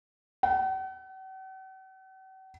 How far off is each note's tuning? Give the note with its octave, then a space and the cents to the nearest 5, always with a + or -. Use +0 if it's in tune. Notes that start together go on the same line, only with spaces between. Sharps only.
F#5 +45